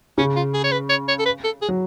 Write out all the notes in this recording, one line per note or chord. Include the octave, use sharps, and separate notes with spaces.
C#3 C#4
F4
G#4
C#5
B4
C#5
C#5
A4
B4
A4
G#4
F#3